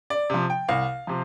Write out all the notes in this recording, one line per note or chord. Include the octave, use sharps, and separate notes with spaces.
D5
C3 F3
G5
C2 F5
C3 F3